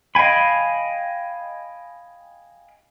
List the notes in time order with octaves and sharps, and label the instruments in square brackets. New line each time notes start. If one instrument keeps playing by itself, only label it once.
[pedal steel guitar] D#5 F5 G5 G#5 B5